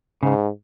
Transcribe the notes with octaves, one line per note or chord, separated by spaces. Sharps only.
G#2 C#3